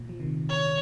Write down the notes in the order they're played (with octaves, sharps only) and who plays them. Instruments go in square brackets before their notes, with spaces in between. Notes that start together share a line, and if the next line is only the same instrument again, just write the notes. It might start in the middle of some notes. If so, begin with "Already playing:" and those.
Already playing: [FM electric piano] A#2
F3
C3 D#3
[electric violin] C#5